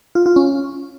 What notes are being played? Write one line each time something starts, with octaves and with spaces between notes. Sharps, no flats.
F4
F4
C#4